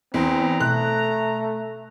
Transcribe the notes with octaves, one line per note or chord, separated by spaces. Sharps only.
E2 C4 A#5
B2 A3 F#6